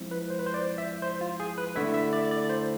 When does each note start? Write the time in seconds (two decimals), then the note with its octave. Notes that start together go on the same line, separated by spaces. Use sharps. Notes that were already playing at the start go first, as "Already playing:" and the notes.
Already playing: F3 G#3 C4 E4
0.11 B4
0.30 C5
0.39 B4
0.46 C5
0.54 D5
0.78 E5
1.02 C5
1.21 F4
1.40 G#4
1.58 B4
1.76 D3 A3 E4 E5
1.94 E5
2.13 D5
2.31 D5
2.49 C5